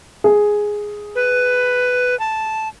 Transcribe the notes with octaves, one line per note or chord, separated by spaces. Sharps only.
G#4
B4
A5